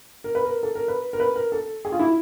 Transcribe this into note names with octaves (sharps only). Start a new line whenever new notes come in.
A#4
B4
A#4
A4
A#4
B4
A#4
B4
A#4
A4
G#4
F4
E4